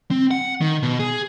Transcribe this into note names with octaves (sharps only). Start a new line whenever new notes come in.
C4
F#5
D#3
B2
G#4